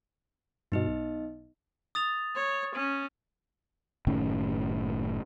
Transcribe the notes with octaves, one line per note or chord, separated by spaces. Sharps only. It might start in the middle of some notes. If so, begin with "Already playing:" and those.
G2 B2 B3 D#4 D#5
B1
D#6 A6 F7
C#5
C#4
F#1 A2 D#3 C#4